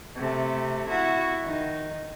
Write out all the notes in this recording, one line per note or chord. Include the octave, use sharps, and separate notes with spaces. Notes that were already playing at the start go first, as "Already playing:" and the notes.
C3 A3
E4 F#4
D#3 D#4